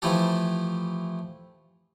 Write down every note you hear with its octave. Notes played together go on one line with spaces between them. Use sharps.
E3 F3 A3 E4 G4 A4